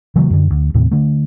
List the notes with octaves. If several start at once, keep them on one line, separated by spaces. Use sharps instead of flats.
C#3 E3 F#3 A3
F#2 D3
D2
D#2 A2 C3
D3 A3